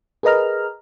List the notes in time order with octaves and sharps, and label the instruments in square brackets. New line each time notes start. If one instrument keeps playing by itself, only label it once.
[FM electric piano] G#4 A#4 B4 D#5 A#5 F6